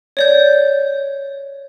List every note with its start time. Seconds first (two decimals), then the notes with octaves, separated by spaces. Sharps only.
0.17 C#5 D5 G6